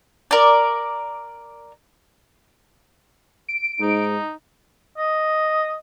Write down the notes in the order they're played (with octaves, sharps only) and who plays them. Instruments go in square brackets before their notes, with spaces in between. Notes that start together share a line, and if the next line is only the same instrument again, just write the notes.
[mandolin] A#4 D5
[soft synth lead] D7
[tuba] G#2 [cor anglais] D#4
[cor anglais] D#5